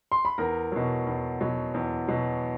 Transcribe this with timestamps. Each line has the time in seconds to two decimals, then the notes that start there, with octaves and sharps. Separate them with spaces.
0.12 C6
0.25 B5
0.38 E2 A#4 A#5
0.72 B2 F#3
1.07 E2
1.41 B2 F#3
1.74 E2
2.08 B2 F#3